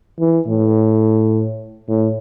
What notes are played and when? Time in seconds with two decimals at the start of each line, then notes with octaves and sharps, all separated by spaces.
0.20 E3
0.47 A2
1.88 A2